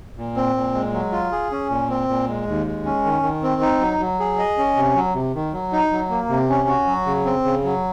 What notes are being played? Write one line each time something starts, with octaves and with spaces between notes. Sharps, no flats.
A#2
C4
A#2
G#3
F#3
F4
G#4
C#4
A#2
C4
A#2
G#3
D#2
G#3
C#4
D#3
D#3
C4
D#4
F#3
F#3
G#4
D#5
C#4
C3
F#3
C3
D#3
F#3
D#4
F#3
A#3
C3
C#4
F#4
F#3
C#3
C4
C#3
F#3